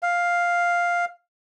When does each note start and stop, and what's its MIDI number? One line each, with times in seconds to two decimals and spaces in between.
0.03 1.05 77